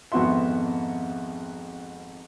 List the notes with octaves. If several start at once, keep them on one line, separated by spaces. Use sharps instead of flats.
G#1 F2 B3 F#4 E5 C6